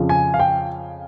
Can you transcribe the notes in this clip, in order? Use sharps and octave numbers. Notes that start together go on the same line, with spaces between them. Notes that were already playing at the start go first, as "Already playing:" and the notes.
Already playing: F2 C#3 F3
G#5
F5
G5